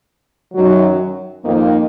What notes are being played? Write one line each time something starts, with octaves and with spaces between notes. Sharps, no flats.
F#2 D#3 F#3
F2 D#3 A#3